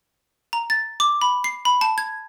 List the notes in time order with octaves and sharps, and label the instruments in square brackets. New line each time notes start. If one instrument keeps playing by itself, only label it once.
[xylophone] A#5
A6
D6
B5
C7
B5
A5
G#6